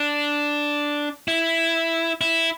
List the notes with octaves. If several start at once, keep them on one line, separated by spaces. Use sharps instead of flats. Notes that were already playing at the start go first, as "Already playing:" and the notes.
Already playing: D4
E4
E4